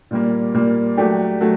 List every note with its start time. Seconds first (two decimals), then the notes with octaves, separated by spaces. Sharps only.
0.11 A#2 G3 A#3
0.54 A#2 G3 A#3
0.97 F#3 A3 D4 G4
1.41 F#3 A3